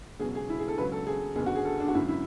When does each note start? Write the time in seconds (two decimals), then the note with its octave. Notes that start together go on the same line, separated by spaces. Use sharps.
0.19 E1 E2 C#3 F#3 G#4
0.35 G#4
0.50 E4
0.59 G#4
0.68 A4
0.77 C#2 C#3 F#3 B4
0.92 A4
1.07 G#4
1.35 F#1 E2 D3 G#4
1.46 F#4
1.55 G#4
1.65 A4
1.80 D4
1.88 F#4
1.94 G#1 F#2 D3 F#3 E4
2.08 E4